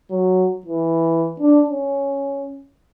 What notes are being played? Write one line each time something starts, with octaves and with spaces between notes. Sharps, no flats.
F#3
E3
D4
C#4